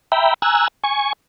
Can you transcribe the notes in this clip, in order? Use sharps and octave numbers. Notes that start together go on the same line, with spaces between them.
E5 G5 A#5 B5
G#5 A#5 E6 F#6
G#5 C#6